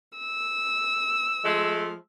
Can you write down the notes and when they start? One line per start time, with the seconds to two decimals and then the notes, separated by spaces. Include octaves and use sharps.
0.18 E6
1.44 F3 G#3 A3